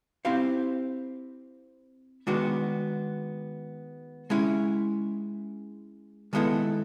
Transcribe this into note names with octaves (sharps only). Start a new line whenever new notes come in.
C4 E4 G4 C5 F5
D#3 G#3 B3 D4 F#4
G#3 C#4 E4
D#3 G#3 B3 E4 A4